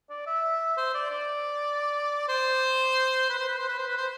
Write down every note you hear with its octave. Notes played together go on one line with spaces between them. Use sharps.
D5
E5
C5
D5
D5
C5
B4
C5
B4
C5
B4
C5
B4
C5